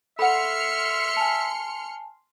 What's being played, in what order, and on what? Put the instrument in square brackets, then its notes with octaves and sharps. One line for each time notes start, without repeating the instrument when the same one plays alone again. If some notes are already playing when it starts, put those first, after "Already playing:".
[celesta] A4 [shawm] E5 [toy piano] F#5 B5 [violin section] C6 F6 C#7
[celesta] G#5 A5